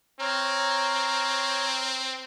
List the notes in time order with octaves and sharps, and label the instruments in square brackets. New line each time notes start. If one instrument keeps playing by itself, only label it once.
[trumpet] C4 [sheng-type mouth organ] C#5 A#5 F6